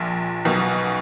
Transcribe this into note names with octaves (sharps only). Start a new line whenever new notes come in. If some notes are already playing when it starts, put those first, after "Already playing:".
Already playing: A#1 A#2
B1 B2